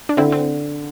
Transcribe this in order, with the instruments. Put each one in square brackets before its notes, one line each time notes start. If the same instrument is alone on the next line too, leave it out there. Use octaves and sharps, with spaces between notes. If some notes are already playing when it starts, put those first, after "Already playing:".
[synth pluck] D4
[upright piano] D3 [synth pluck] C4 E4
[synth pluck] C4